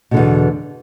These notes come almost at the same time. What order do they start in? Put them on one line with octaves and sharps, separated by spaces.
B2 D3 E2